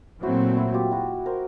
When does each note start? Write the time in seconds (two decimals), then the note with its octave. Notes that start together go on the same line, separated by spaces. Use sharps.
0.23 A#2 F#3 A3 C4 E4 F#4
0.57 E4 F#4
0.74 F4 G4
0.91 E4 F#4
1.26 A#4 C5